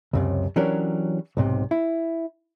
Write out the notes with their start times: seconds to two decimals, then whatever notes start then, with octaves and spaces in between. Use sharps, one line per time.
0.13 C#2 F#2 C3
0.56 E3 F#3 C#4 D4 G4 A#4
1.37 B1 G#2 C3
1.71 E4